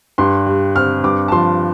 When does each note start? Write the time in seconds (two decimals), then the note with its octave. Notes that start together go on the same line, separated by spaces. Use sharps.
0.18 G2 C6
0.46 G3
0.76 C4 F6
1.04 G2 D6
1.28 A5
1.32 F3 C6